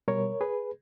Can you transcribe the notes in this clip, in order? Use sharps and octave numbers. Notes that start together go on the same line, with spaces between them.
B2 G3 A#4 C#5
G#4 B4